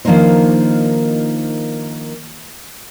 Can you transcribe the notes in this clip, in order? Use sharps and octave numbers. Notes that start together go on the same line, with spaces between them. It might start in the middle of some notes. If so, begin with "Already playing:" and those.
D#3 F3 A#3 D4 D#4 C5